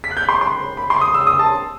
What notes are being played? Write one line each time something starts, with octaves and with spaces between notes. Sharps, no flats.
B6
F#6
G6
C6
C6
B5
C6
D#6
E6
D#6
A5